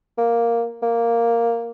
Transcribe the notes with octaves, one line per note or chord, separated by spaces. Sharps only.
A#3
A#3